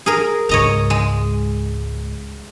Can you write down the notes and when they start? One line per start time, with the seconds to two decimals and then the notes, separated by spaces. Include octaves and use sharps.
0.06 G#4 A#4
0.49 C#2 G#2 C#5 D#5 A#5
0.90 G#3